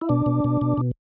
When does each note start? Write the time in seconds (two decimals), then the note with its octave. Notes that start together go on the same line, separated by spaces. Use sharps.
0.01 E4
0.09 B2 D4
0.26 B2
0.44 B2
0.61 B2
0.77 B2